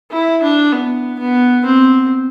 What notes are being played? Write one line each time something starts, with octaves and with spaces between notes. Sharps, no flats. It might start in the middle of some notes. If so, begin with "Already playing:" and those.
E4
D4
B3
B3
C4